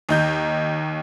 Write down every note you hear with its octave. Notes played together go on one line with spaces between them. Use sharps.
D#2 D#4 G6